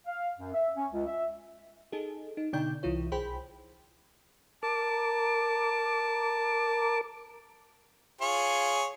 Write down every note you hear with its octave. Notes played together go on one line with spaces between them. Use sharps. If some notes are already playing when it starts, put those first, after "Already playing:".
F5
F#2
E5
C#4
C#2
E5
D#4 G#4 A4
D#4
B2 D3 D#4 D5 G5 G6
C2 E3 E4 F4 C#5
B1 G#4 C5 G5 B5
A#4 A5 D6
F4 G#4 C#5